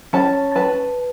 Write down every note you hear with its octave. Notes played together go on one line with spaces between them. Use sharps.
C#4 A5
B4 A5